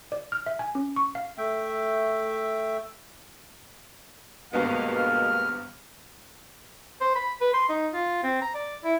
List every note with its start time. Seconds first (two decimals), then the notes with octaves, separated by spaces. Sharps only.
0.12 D5
0.32 F6
0.46 E5
0.59 G#5
0.75 C#4
0.96 C#6
1.15 F5
1.38 A3 E5 G5
4.53 G#1 G2 B2 G#3 A#3 B3 F5
4.96 F6
7.01 C5
7.15 B5
7.41 B4
7.53 C6
7.69 D#4
7.93 F4
8.23 C4
8.42 A#5
8.55 D5
8.84 E4